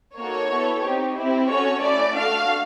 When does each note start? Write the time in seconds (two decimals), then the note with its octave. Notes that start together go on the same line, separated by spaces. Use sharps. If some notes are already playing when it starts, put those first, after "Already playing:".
0.18 A#3 D#4 F#4 A4 C#5
0.52 B3 E4 A4
0.83 C4 D#4 G4
1.17 C4 E4 G4
1.49 C#4 F#4 A4 C#5
1.83 A3 C#4 E4 D5
2.16 A3 D4 F#4 A4 F5